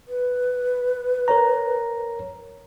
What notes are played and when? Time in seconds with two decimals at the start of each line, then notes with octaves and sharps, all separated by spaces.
0.08 B4
1.28 A#4 C#5 A#5